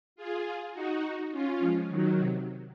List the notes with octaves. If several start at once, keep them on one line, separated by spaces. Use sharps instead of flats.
F4 G#4
F4 G#4
D#4 F#4
D#4 F#4
C#4 F4
F3 G#3
D#3 F#3
C3